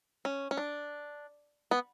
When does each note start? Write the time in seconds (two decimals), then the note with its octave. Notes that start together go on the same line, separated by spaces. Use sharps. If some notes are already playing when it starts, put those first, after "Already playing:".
0.25 C#4
0.51 C#4
0.57 D4
1.71 B3